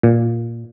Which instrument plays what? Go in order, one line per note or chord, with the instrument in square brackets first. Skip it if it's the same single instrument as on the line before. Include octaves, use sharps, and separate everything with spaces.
[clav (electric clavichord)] A#2